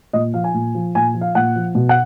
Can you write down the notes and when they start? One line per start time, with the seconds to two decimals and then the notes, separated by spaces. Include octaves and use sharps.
0.13 A#2 D#5
0.34 F3 F5
0.44 G#5
0.54 A#2
0.75 F3
0.95 A#2 G#5
1.15 F3
1.21 F5
1.35 A#2 F#5
1.56 F3
1.75 B2
1.89 F#5